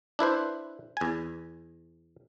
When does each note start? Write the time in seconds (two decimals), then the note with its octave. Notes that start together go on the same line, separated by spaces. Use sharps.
0.19 D4 E4 B4 C5
0.97 E2 G#5